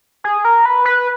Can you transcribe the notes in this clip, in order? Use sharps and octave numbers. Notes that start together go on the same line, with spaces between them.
G#4
A#4
B4
B4